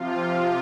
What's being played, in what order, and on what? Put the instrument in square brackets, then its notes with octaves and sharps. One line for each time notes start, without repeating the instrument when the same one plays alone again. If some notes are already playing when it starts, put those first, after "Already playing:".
Already playing: [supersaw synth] C3 F3 F4